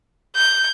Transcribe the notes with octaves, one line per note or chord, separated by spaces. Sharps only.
G6